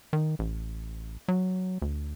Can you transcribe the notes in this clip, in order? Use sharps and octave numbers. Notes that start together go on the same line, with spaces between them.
D#3
A1
F#3
D2